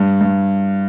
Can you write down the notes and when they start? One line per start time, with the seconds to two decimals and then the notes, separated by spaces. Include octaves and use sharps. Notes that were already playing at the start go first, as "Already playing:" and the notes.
Already playing: G2
0.21 G2